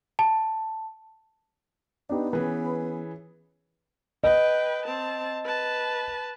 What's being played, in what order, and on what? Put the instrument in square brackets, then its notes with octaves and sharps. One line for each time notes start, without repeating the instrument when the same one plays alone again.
[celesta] A5
[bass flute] B3 [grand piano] D4 D#4 G4
[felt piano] E3 G#4 [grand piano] C#4 B4
[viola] B4 G5 [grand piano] D#5
[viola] C4 A5
B4 A5